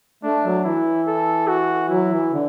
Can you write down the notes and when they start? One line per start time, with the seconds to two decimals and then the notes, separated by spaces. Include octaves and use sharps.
0.23 A3 D4
0.44 F#3
0.64 E3 E4
1.07 A4
1.48 F#4
1.89 F#3 E4
2.10 E3
2.31 D3